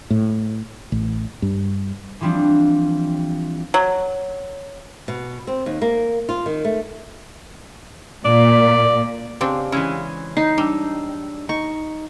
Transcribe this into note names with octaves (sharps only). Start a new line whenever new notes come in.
A2
A1
G2
E3 F3 G3 C4 D4
F#3
B2
C4
D#2
A#3
F4
D#3
A3
A#2 D5
C#3 C4 D4 G4 F5
E3 G#3 C#4 E4
D#4 C7
G3 D4 E6
D#4 C#6